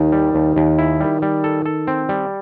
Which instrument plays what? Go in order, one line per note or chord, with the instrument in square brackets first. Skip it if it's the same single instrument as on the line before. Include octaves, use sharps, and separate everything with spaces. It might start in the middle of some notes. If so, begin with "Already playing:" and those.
Already playing: [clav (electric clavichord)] D#2 [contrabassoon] D#3
[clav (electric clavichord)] G3
D#2
D#2
E4
G3
G3
A4
A4
C4
G3